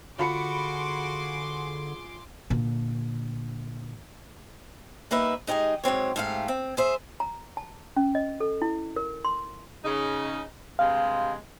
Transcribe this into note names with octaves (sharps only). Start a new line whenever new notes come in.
D3 F4 F#4 G#4 B5 C6 D6 C#7
A#2 D3
G3 A#3 D#4 B4 E5
G#3 D#4 G4 G#4 D#5
G#2 F#3 C4 C#5
G#2 C3 A3 G4 B4 F5
C4
G#4 C5 E5
A#5
A5
C#4
D#5
A4
E4
A#4
C6
C#3 D#4
G2 C3 G#3 F5